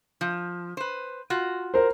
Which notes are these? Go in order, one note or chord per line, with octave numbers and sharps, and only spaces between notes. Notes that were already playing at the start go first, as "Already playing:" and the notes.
F3
B4 C5
F4 F#4
A#4 C5